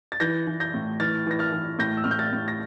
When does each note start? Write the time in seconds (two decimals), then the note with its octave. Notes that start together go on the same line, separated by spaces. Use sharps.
0.12 A6
0.20 E3 G6 A#6
0.47 E3
0.60 G6 A#6
0.74 A2
1.00 E3 F6 A6
1.27 E3 A#6
1.39 F6 A6
1.53 E3
1.79 A2 G6 A#6
1.97 E6
2.04 A2 F6
2.11 G6
2.19 F6 A6
2.33 A2
2.48 A#6